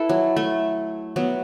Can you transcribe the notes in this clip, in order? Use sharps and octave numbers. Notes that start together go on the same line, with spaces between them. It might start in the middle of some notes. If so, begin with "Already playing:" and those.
Already playing: E4 A4 B4
F#3
A3
F#3 B3